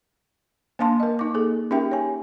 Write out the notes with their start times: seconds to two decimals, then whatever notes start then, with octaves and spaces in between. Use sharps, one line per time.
0.79 A#3 D4 F5 A5 C6
1.00 A#4 D#5
1.19 D#4 D6
1.34 A#3 G#4 A4
1.71 C#4 D#4 G4 A#4 E5 G5
1.91 C#5 G#5